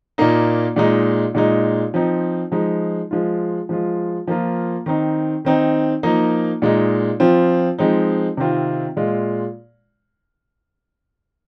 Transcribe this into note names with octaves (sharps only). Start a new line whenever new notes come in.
A#2 A#3 D#4
A#2 G#3 D#4
A#2 G#3 D#4
F3 C4 D#4
F3 G#3 D#4
F3 G#3 F4
F3 G#3 F4
F3 A#3 F4
D#3 C4 D#4
D#3 C4 D#4
F3 A#3 D#4
A#2 G#3 D#4
F3 C4 F4
F3 G#3 C4 D#4
C3 D#3 C4 F4
A#2 G#3 F4